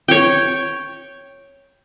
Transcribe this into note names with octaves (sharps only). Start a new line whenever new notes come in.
C#5 G5